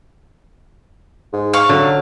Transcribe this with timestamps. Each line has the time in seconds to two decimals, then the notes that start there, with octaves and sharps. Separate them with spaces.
1.33 G#2
1.53 F5 C#6
1.69 D3 F#3